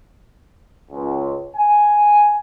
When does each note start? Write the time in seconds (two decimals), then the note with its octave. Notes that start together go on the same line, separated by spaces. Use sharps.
0.92 C#2
1.56 G#5